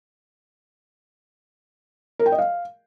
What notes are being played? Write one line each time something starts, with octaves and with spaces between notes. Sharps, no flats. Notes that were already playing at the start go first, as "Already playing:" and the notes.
A#4
G5
D#5
F5